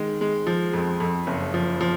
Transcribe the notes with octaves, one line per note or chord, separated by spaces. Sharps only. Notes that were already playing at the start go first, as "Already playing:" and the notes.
Already playing: D#3 G#3
G#3
F3
F2
F2
F#1
F3
F3